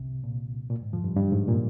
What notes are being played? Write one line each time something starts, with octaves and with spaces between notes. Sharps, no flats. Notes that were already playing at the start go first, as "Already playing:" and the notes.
Already playing: C2 C3
A#2
A#2
G#2
F2 F3
G2
G2
G#2
A#2